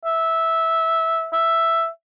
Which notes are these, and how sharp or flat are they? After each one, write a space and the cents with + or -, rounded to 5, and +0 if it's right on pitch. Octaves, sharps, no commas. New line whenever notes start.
E5 -10
E5 +5